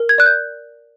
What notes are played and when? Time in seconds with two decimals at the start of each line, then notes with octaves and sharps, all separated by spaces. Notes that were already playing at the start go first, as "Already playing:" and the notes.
Already playing: A#4
0.09 G#6
0.18 D5 F#6
0.26 G6